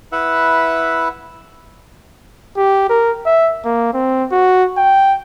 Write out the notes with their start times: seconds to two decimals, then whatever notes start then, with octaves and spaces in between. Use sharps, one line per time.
0.12 E4 B4 E5 F#5
2.57 G4
2.90 A#4
3.26 E5
3.64 A#3
3.94 C4
4.32 F#4
4.77 G5